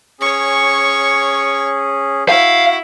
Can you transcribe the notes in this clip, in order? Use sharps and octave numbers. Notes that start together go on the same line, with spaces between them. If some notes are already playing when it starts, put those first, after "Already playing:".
C#4 G#4 C#5 C#6
E4 F#4 F5